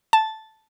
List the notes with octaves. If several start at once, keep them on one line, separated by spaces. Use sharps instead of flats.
A5